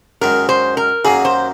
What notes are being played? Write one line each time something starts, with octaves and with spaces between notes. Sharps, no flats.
F#2 D#3 G#3 A#4
C5
A#4
F#2 D#3 F#3 A#3 G#4
C5